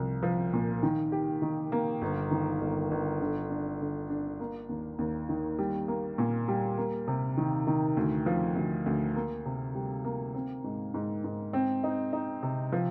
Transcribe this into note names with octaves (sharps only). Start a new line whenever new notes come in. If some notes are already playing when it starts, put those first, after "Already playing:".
Already playing: C2 F3
F3
A#2
D#3
G4
D#3
A#3
G1
D#3
G1
G1
D3
D4
D3
D4
A#3
D#2
D#2
D#3
G3
A#3
A#2
G3
A#3
C3
D#3
D#3
D2
F3
D2
D2
A#3
C3
G3
A#3
C4
G#2
G#2
G#2
C4
D#4
D#4
C3
F3